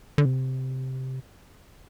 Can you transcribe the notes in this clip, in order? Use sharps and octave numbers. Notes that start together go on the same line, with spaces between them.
D3
C3